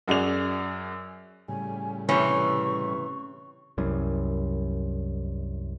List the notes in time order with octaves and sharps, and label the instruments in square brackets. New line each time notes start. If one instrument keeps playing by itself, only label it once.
[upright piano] F#2 F#4 G#4 D5 F7
[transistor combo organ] A2 C#3 G3 [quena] G#5
[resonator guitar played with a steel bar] C3 E3 [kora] C#4 [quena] C#6
[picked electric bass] C2 F#2